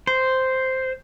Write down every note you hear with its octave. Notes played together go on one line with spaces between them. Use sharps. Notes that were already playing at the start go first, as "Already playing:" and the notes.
C5